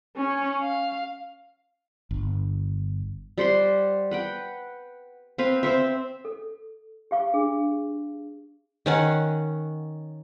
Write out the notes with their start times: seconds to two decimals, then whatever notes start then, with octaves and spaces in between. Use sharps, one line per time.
0.16 C#4
0.62 F5
2.11 G1
3.38 G3 C5 F#5 C6
4.11 B4 F#5 G5
5.38 C4 B4 F5
5.63 C4 C5 E5
6.25 A4
7.11 G4 F5 C#6
7.34 D4 G#4
8.86 D#3 C#4 F#5